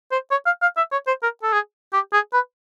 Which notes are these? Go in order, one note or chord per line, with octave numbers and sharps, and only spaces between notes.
C5
C#5
F5
F5
E5
C#5
C5
A#4
A4
G#4
G4
G#4
B4